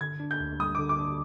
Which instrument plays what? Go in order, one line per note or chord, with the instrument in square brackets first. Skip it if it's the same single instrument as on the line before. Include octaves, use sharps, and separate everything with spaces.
[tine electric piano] D3 [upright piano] G#6
[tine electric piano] D4
[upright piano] G6
[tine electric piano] D2
[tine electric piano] G3 [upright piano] D#6
[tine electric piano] D3 [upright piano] D6
[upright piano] D6
[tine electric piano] D4